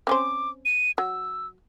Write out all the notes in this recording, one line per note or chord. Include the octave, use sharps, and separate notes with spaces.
C4 C#4 C5 D6
D#7
F#3 E6